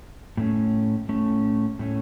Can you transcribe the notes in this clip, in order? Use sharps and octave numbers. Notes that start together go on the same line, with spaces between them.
A2 A3 C#4
A2 A3 C#4
A2 A3 C#4